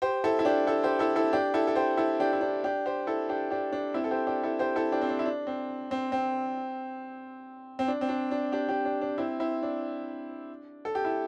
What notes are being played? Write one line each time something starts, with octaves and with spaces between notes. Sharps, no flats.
G4 C5
E4 A4
E4
D4 G4
E4 A4
G4 C5
E4 A4
E4 A4
D4 G4
E4 A4
A4
G4 C5
E4 A4
D4 G4
E4
D4
D4 G4
G4 C5
E4 A4
D4 G4
D4 G4
D4
C4 E4
A4
G4 C5
D4 G4
E4 A4
G4 C5
E4 A4
D4 G4
C4
D4
E4
D4
C4
C4
C4
C4
D4
C4
D4
D4
D4 G4
D4 G4
D4
D4
C4 E4
C4 E4
D4
A4
G4
E4